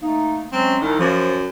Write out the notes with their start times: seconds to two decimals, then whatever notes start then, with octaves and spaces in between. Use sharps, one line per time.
0.03 A3 A#3 D#4
0.53 F#3 G#3 C4 C#4
0.81 C2 D#3
1.00 F#2 F3